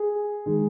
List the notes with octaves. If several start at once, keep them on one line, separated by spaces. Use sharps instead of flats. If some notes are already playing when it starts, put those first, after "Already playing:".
Already playing: G#4
D#3 G#3